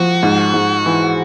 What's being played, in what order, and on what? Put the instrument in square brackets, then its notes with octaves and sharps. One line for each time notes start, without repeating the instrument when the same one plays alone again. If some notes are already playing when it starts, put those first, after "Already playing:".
Already playing: [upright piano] F3 [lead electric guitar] F#4
[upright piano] G#2
G#2
E3